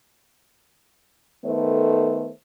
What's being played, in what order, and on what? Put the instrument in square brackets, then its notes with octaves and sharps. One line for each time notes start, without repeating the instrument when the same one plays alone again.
[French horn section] D#3 A3 B3 A4 C5